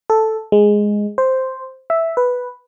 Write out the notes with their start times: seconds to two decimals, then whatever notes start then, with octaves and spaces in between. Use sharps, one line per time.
0.10 A4
0.52 G#3
1.18 C5
1.90 E5
2.17 B4